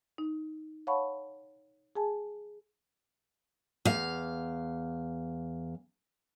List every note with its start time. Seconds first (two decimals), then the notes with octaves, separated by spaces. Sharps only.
0.18 D#4
0.87 C#5 F5 F#5 A5 B5 C#6
1.96 G#4 G#5 A5
3.85 E2 F5